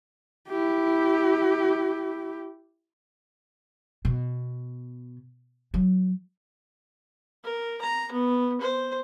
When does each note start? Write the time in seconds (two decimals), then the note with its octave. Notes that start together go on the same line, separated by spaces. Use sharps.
0.49 E4 G4
4.05 B2
5.74 F#3
7.44 A#4
7.81 A#5
8.12 B3
8.61 C5